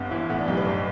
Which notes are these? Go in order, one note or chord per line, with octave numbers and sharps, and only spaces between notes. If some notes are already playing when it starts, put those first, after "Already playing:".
Already playing: G1 G2 B3
E3 E4
A2 B3
D4
B1 G4
B4
G1